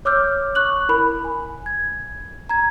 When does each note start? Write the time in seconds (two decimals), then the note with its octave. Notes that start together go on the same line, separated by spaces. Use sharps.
0.05 C#5 D6 E6 F6 G6
0.55 C#6 F#6 F#7
0.89 E4 A#4 B5
1.24 G#5
1.66 G#6
2.49 A#5 G#6